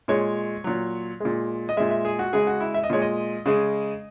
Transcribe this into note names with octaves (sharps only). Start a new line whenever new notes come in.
A#2 G#3 C#5
A#2 F#3
A#2 G#3
D#5
A#2 G#3 E5
E5
G#4
F#4
C#3 G#3 G#4
F#4
E4
E5
D#5
A#2 G#3 C#5
D#5
C#3 G#3